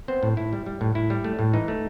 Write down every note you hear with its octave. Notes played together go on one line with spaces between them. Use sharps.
B3 C4 C5
A2
A2 E4
G3
G3
A2
A2 E4
G3
A3
A2
E3 D#4
A3